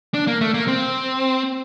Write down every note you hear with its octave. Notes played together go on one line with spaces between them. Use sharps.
D4
A#3
A3
A#3
C4